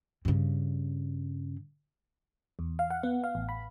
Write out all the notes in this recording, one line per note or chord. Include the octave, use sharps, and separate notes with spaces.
G2 C#3
E2
F5
F#5
B3
F5
A1
B5